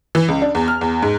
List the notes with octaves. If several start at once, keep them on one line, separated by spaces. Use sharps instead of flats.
E3
C#2
D4
E2
F6
E2
G#2